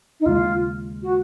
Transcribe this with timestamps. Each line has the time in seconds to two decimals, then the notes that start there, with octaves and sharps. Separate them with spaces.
0.20 D#4
0.26 D#2 C#3 G#3 F4
1.03 F#4